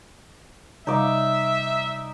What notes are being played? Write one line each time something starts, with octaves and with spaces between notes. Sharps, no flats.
C3 G3 D#4 D5 E5 F5